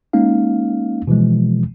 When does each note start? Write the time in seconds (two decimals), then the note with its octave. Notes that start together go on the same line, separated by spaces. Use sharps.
0.13 G#3 A#3 C#4 D#4 F5
1.07 B2 E3 F3 G#3